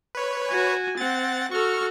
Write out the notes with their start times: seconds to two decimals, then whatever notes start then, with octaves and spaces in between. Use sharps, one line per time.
0.15 B4 C#5
0.47 F#4 G#5
0.97 C4 F#5 A6
1.51 F#4 A4 C#6 F6